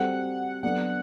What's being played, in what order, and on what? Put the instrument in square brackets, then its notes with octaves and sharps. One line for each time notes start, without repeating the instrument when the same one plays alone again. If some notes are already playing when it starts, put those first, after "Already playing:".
Already playing: [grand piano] G3 C4 F#4 A4 C5 [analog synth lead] F#5
[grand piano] F#3 B3 D4 A4 D5 [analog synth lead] F#5